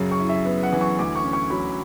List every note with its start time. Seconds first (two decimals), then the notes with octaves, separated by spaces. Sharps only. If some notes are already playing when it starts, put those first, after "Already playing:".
Already playing: F#2 C#3
0.12 C#6
0.20 E4
0.29 E5
0.45 B3
0.63 F#5
0.72 E3
0.81 C#6
0.99 D2 D6
1.16 C#6
1.24 C#4
1.33 C#6
1.50 F#3 B5